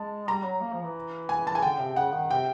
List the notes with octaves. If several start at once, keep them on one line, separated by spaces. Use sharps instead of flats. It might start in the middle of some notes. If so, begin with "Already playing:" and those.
Already playing: G#3 A5
G3 A#5
F#3
A#3
F3
E3
G#5
A5
G#5
D3 G5
C3
C#3 F#5
D#3
C3 G5